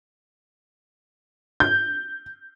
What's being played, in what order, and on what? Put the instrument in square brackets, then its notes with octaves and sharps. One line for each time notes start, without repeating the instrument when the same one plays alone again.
[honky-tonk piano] G6